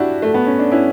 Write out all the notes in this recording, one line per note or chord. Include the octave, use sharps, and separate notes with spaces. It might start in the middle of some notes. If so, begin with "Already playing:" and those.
Already playing: D4 E4 F#4 G4
A3
B3
C#4
D4
C#4 E4